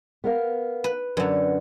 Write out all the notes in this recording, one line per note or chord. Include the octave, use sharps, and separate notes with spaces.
B3 A#4 F5
B4
F#2 D3 B4 D5 F#5